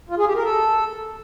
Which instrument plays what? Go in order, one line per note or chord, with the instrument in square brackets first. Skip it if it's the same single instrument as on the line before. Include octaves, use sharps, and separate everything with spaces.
[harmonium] F4
G#4
G4
A#4
A4